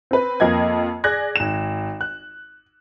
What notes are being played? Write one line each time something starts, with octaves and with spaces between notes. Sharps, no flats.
C4 B4
F2 A#3 D#5 G#6
G#4 D5 F#6 G#6 A#6
G#1 E7
F#6